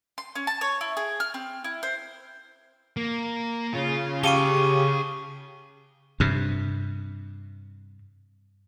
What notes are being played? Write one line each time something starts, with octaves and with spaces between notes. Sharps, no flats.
C6
C#4
A5
C#5
E4
G#4
F6
C4
E4
C5
A#3
C#3 F4
G4 G#4 F5 A5 C#6 D#7 G7
G2 C3